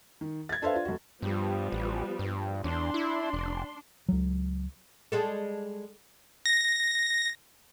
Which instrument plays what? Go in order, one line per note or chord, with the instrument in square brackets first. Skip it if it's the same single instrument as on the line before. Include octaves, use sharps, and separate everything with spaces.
[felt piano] D#3
G#6 A6
D4 A4 B4 C5 E5 F5
D4 F4
F1 F#4
[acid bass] G2 [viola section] F3 G3 B3
[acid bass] A1
G2
[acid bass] E2 [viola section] D4 C6
[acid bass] E4
F1
[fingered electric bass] C#2 F#3
[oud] G3 G#3 A4
[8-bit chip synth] A#6